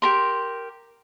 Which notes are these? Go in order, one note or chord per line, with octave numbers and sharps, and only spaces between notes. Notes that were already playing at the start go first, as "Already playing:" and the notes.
G4 A#4 C6